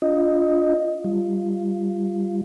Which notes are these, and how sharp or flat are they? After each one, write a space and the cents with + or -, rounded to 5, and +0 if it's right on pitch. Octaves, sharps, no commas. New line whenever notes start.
D4 -30 F4 +0 D#5 +0
G3 +0 F4 -15